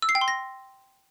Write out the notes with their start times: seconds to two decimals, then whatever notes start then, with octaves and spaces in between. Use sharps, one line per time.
0.02 E6
0.09 C7
0.15 G5
0.21 C6
0.28 A#6